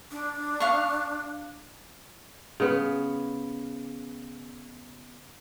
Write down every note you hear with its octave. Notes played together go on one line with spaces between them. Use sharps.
D4
F5 C#6
C#3 B3